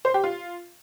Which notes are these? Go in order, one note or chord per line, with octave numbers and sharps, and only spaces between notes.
C5
G4
F4